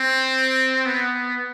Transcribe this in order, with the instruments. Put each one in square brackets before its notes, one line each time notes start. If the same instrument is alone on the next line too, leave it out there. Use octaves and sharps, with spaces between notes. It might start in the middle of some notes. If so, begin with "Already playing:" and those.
Already playing: [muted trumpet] C4
B3